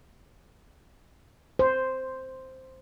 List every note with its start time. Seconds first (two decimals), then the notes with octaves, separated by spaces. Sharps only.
1.59 C5